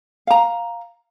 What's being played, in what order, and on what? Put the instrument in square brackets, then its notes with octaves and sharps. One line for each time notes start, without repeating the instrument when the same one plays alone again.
[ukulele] F5 A#5